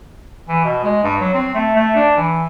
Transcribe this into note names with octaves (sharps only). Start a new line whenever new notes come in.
E3
B2
G#3
G2
F#3
C4
A3
A3
D4
E3